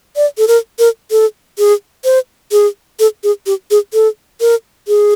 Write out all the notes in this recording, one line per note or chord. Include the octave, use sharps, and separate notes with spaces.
D5
A4
A#4
A#4
A4
G#4
C5
G#4
A4
G#4
G4
G#4
A4
A#4
G#4